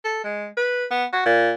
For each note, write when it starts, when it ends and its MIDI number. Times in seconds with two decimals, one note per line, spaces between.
0.05 0.23 69
0.24 0.46 56
0.57 0.85 71
0.91 1.04 59
1.13 1.21 66
1.25 1.52 46